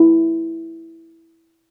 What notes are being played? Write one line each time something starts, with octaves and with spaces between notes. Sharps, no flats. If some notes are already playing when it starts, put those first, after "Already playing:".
Already playing: E4